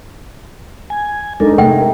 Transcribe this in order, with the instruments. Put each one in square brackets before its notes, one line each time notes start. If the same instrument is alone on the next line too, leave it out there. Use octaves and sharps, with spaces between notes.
[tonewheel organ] G#5
[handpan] G#3 D#4 [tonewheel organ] D4 A4 A#4
[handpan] C3 A3 [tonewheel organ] A#4 [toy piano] G5